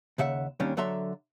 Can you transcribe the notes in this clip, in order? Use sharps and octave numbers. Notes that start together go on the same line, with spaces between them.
D#2 C#3 E5 F#5
D#2 C3 D#3 G3 C#4 D4
D3 F#3 A4 E5 A#5 C6